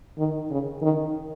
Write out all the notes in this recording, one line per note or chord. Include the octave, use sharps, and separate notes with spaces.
D#3
C#3
D#3